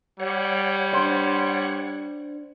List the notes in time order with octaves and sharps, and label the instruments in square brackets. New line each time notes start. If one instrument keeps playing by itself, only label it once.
[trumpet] G3 [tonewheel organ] C#5 F#5
[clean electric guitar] D4 C5